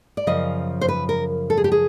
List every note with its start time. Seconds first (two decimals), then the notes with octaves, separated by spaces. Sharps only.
0.17 D5
0.27 F#2 C#3 F3 D#5
0.81 C5
0.88 B4
1.09 A#4
1.50 A4
1.57 G#4
1.64 G4
1.72 G#4